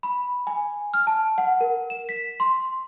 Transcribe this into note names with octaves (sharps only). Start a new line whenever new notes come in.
B5
G#5
F6
A5
F#5
A#4
E7
B6
C6